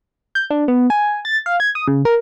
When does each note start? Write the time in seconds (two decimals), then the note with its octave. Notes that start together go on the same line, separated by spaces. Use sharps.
0.35 G6
0.51 D4
0.68 B3
0.90 G#5
1.25 A6
1.46 F5
1.60 G#6
1.75 D#6
1.88 C#3
2.05 A#4